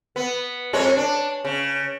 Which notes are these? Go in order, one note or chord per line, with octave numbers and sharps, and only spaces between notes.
B3
F2 G#3 C#5
D4
C#3